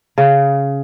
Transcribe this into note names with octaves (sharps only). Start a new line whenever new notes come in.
C#3